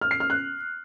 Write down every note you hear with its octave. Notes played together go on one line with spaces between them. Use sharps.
F6
C7
F6
F#6